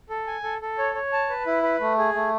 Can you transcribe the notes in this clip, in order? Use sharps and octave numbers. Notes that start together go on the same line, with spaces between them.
A4
G#5
A4
A4
C#5
C#5
A5
B4
E4
B4
A3
G#4
A3